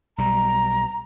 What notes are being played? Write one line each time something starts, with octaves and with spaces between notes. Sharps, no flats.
B1 G3 A#5